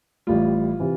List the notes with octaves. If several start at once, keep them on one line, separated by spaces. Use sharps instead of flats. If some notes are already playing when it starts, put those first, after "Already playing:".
A1 A2 G3 F4
C3 E3